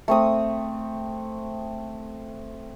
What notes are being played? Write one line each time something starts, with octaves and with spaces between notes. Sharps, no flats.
A3 C4 D#6